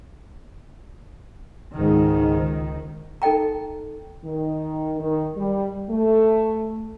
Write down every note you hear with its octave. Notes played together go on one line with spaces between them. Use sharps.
C#2 G#2 D#3
D#4 A4 D#5 G5 A#5
D#3
D#3
G3
A3